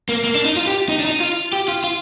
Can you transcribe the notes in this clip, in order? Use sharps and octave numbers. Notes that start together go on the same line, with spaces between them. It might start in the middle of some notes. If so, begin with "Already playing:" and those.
A#3
A#3
D4
D#4
F4
G4
D#4
D4
D#4
F4
G4
F4
F4